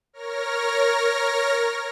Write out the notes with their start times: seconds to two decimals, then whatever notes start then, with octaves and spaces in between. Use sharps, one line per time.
0.13 A#4 C#5 F6 A#6